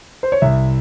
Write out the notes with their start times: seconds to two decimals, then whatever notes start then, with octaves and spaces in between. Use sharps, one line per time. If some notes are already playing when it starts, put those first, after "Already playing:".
0.23 C5
0.32 C#5
0.42 C2 E5